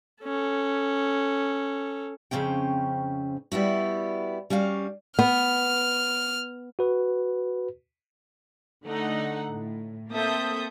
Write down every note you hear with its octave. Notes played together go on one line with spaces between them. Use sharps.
C#4 A4
F2 C#3 C4 C#4 G5
G3 B3 E4 F#4
G3 C#4 F#4 F5
B3 F6
F#4 B4
D3 A3 D#4 F#5
A2
A#3 C4 A4 E5 D#6 G6